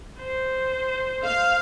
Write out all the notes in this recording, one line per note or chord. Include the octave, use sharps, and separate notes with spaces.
C5
F5